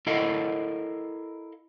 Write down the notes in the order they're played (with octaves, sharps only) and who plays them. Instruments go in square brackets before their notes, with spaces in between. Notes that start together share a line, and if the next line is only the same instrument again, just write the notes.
[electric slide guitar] E4 A4 A#4 D#5 F5